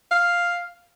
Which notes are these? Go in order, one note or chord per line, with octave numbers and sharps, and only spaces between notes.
F5